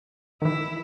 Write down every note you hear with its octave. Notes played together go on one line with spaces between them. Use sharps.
D#3 E3 E4